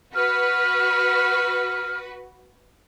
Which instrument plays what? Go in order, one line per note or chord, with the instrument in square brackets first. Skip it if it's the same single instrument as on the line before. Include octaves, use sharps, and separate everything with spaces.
[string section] F#4 B4 [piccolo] F6